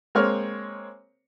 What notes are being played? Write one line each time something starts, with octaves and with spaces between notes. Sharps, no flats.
G#3 A#3 C4 C#5 F6